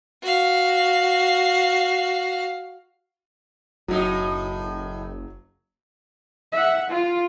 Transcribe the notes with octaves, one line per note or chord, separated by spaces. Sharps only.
F#4 F5
F#1 A2 F#3 D#4
E5 F#5
F4